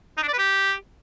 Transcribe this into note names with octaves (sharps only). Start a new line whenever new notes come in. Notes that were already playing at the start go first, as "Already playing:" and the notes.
D#4
D4
D5
B4
G4